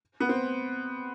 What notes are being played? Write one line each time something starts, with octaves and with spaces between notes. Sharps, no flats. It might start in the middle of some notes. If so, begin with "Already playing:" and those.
B3
C4